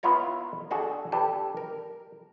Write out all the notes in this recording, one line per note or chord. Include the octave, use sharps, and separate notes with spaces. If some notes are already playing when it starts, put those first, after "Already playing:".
B3 E4 F4 C#5 A#5
D4 F#4 G#4 A4
D4 G4 A4 B4
A#4